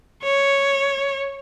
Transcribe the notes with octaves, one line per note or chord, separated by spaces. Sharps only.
C#5